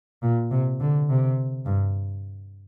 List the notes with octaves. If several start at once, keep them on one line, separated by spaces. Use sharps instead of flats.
A#2
C3
D3
C3
G2